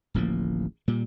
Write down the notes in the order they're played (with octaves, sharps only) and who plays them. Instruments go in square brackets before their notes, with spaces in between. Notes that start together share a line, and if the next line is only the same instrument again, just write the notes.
[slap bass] D1 A1 F3 A#3
A#2 G3